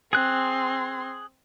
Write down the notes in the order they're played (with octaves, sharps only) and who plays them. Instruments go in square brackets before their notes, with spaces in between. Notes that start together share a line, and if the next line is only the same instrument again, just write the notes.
[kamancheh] C4 C6 [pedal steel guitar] G#4 F#6